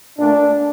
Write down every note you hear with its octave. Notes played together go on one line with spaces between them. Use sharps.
A#2 A3 D4